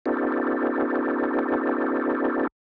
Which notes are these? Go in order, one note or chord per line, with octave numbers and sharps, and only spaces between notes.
B3 C#4 D#4 F4 G4 A4